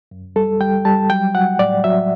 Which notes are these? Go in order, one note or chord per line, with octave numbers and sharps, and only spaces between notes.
F#2
G3 A4
G3 G5
G3 A5
F#3 G5
F#3 F#5
A2 D5
F#3 E5